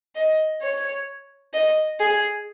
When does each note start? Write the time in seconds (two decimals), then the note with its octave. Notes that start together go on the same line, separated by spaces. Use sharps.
0.15 D#5
0.61 C#5
1.54 D#5
1.99 G#4